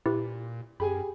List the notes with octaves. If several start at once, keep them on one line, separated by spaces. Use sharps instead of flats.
A#2 E4 G4 B4
F#2 G4 G#4 G#5 B5